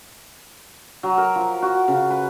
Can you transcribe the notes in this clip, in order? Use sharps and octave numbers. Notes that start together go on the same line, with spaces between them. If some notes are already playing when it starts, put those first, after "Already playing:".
F#3
A#4
F3
F#4
C#3
B4